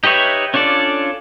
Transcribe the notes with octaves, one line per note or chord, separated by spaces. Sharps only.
D#4 G4 B4 C#5 E5
C#4 D4 F4 A4 D5